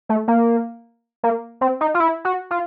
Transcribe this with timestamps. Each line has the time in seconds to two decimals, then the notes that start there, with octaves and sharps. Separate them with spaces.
0.09 A3
0.28 A#3
1.23 A#3
1.61 C4
1.81 D#4
1.94 F4
2.00 E4
2.25 F#4
2.51 F4